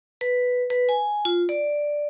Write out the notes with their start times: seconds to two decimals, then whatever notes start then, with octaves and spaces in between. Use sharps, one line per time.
0.21 B4
0.70 B4
0.89 G#5
1.25 F4
1.49 D5